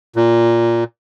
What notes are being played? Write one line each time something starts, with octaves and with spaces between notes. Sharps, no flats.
A#2